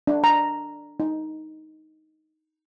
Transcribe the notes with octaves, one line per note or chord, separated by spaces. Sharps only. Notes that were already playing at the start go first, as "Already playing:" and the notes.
D4
A#5
D#4